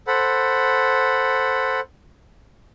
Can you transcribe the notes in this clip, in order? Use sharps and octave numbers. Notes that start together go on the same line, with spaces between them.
A4 C5 F#5 B5